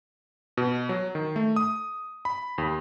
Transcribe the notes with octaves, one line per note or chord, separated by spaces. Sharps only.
B2
F#3
D#3
A3
D#6
B5
D#2